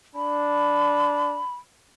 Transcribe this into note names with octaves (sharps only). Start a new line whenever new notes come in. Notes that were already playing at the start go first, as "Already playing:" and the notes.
D4 B5